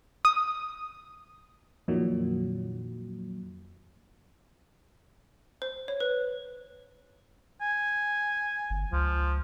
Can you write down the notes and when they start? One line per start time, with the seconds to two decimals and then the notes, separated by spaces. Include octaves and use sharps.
0.25 D#6
1.88 F2 A#2 D#3 F#3
5.62 C5
5.88 C#5
6.00 B4
7.61 G#5
8.70 G1
8.92 C#2 F3